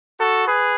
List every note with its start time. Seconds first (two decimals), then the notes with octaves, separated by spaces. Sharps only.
0.19 F#4 A4
0.47 G#4 B4